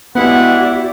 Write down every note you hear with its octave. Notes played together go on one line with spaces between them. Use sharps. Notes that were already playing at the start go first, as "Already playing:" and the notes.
G#3 B3 E4 F#4 G4 D5 F#5